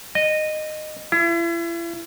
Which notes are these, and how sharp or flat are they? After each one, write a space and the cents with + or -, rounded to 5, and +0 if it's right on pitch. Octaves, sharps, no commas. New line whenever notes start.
D#5 -15
E4 +40